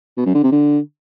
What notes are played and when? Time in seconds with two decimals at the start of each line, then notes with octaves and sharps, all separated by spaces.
0.17 B2
0.26 F#2
0.34 D3
0.43 C3
0.52 D3